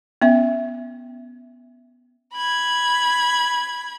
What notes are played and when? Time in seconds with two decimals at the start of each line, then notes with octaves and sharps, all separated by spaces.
0.22 B3 C#4 E5
2.35 B5 G#6